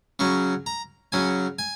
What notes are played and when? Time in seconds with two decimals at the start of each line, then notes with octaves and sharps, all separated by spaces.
0.19 C#3 F#3 C#4 C#6
0.66 A#5
1.12 C#3 F#3 C#4 G#5
1.59 G#5